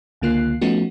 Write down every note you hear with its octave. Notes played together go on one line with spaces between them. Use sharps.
C#2 D3 A#3 F4 F#6 C7
F3 A3 B3 C#4 D#4 F#4